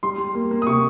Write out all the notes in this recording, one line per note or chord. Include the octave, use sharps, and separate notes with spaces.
G3 C6
G3
A#3
A#3
D#6
C3 C#6